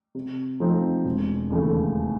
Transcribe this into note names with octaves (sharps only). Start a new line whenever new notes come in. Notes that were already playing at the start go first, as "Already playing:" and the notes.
C3
F3 A3 C4 D#4
E1
D#2 C#3 E3 A3